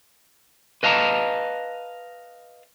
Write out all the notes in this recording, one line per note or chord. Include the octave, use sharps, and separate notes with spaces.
B4 D#5 F5 A5 A#5